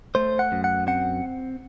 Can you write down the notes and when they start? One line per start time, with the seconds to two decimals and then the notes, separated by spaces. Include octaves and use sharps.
0.15 A3 C5
0.39 F#5
0.52 F#2
0.64 F#5
0.87 C4 F#5